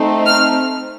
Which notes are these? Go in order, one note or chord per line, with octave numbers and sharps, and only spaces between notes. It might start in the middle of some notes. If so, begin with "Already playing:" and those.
Already playing: A3 C4 D#4
F6